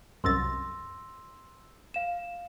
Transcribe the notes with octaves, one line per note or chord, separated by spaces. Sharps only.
C2 F#2 C6 E6 A6 A#6
F5 E7